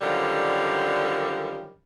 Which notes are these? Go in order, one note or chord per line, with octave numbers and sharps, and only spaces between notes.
F#2 D3 D#3 F3 G3